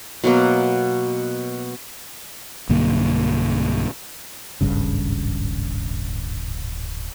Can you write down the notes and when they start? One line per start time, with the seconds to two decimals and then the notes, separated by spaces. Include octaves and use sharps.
0.24 B2 F#3 A#3
2.69 B1 G2 D3 A#3
4.61 D1 G#1 G2 C#3